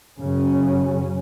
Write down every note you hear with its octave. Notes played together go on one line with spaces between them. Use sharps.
F#2 C#3 F#3 C#4